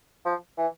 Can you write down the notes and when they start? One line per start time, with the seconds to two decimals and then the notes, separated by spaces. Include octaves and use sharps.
0.25 F3
0.57 E3